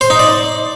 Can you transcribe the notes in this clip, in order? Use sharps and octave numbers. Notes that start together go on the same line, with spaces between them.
C5
D#4
D5